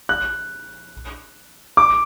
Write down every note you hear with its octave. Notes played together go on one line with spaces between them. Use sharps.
F#6
D6